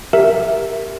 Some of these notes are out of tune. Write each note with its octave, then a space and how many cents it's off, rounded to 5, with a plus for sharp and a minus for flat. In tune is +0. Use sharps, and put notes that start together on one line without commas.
G4 +10 A#4 +0 E5 +0